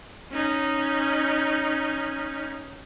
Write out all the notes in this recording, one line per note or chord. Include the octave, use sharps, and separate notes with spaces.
C#4 D#4